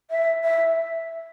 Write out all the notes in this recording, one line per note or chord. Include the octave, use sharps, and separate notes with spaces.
E5
E5